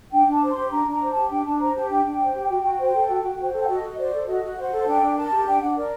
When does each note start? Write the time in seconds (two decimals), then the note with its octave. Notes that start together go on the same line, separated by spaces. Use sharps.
0.12 D4 G5
0.27 D4 A5
0.42 C5
0.51 G4 C6
0.70 D4 A#5
0.86 D4 A#5
1.01 C5
1.11 A5
1.16 G4
1.30 D4 G5
1.45 D4 A5
1.59 C5 A#5
1.74 G4 A5
1.90 D4 G5
2.05 D4
2.20 C5
2.34 G4
2.50 F#4
2.64 F#4
2.79 C5
2.93 A4
3.09 F#4
3.23 F#4
3.39 C5
3.53 A4
3.61 F#5
3.68 F#4 D#5
3.83 F#4
3.98 C5 D5
4.13 A4
4.27 F#4 D#5
4.42 F#4
4.57 C5 F#5
4.72 A4
4.86 D4 G5
5.02 D4
5.17 A#4 A5
5.32 G4
5.47 D4 G5
5.62 D4 F#5
5.76 A#4 D5